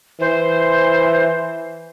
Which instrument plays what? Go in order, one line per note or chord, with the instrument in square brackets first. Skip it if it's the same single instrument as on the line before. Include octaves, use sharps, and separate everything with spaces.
[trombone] E3 [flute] C5